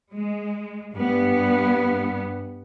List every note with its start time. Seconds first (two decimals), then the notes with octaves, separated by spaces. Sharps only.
0.12 G#3
0.94 G2 B3